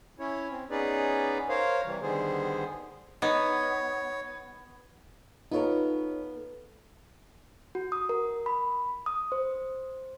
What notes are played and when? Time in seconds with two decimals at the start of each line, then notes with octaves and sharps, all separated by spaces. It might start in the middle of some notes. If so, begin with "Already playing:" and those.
0.19 C#4 E4 C#5
0.51 C4
0.71 B3 C#4 D#4 G#4 B4 D5
1.49 A#4 C5 C#5 F5
1.85 C3 E3 G3
2.02 D3 D#3 G3 B3 G#4 C5
3.22 B3 D#4 C#5
5.51 B3 D#4 F4 A4 A#4 C#5
7.75 F#4
7.92 D#6
8.09 A#4
8.46 B5
9.06 D#6
9.32 C5